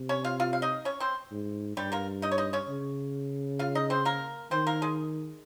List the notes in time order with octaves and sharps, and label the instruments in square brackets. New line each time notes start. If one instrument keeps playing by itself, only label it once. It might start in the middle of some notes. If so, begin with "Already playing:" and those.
Already playing: [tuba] C3
[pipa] C#4 C#5
F4 F5
F4 F5
F5
D#4 D#5
C#4 C#5
C4 C5
[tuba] G#2
[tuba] G2 [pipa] G3 G4
[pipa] A#3 A#4
D#4 D#5
C#5
D#4 D#5
C#4 C#5
[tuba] C#3
[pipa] F4 F5
D#4 D#5
C4 C5
A#3 A#4
[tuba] D#3 [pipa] C4 C5
[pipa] A#3 A#4
G#3 G#4